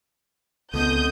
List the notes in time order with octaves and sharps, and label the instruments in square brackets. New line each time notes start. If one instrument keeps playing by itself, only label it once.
[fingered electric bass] C#2 B3 [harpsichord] D3 G#3 C4 [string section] D#6 G6